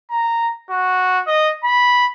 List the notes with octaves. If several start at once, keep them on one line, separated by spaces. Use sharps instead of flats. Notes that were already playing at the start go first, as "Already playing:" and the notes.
A#5
F#4
D#5
B5